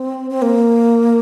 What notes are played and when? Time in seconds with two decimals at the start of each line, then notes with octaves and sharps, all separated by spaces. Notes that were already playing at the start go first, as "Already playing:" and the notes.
Already playing: C4
0.31 C4
0.42 A#3